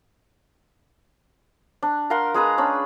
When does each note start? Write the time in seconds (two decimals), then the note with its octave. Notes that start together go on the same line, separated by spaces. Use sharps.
1.83 D4
2.10 A#4 F5 F#5 C6
2.34 G#3 G#4 B4 A#5
2.58 C#4 D4 B5